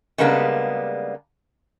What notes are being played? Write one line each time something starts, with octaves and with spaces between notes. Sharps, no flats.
C#3 G3 G#3 A#3 B3 D4